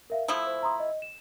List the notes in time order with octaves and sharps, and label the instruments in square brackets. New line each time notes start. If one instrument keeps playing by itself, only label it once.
[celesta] A#4 E5 F5
[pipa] F3 A3 E4 [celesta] D#6 E6
[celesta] C5
A#5 C6 D#6
D#5
E7